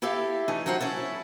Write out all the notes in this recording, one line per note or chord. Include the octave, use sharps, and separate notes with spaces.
E4 G4 A4 E5 F5
E3 A3 C#4 D#4
F#3 D#4 F4 C5 F#5
C#4 E4 A4